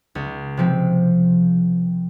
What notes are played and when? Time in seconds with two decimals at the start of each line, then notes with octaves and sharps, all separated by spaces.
0.15 C#2
0.57 C3 F3 C4